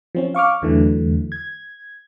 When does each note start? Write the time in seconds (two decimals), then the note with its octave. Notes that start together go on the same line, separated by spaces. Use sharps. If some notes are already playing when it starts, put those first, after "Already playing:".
0.15 F3 C4 C#4
0.35 F5 C#6 D6 F6
0.62 E2 D3 E3 F#3 A3
1.32 G#6